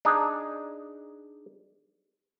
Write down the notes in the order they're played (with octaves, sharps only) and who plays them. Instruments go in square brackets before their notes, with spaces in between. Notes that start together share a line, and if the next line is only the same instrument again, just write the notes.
[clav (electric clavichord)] D4 D#4 G#4